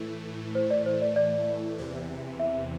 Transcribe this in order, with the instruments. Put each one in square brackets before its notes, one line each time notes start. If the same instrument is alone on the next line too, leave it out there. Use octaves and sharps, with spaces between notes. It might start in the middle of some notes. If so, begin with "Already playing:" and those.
Already playing: [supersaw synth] A2 E3 A3
[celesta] C5
D5
C5
D5
D5
[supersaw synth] E2 C3 E3
[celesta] E5